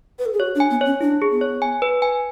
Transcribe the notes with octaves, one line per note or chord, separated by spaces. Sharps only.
B4
A4
G#4
F#4 C#5
D4
G#5
B3
C#4 C#5
D4 E4
G#4
B3
C#5
G#5
B4
G#5